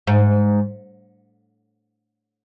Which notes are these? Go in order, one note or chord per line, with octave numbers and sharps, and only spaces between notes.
G#2